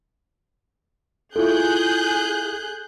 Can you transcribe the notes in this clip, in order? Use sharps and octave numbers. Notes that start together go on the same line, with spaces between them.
E4 F4 G#4 A4 F#6 G6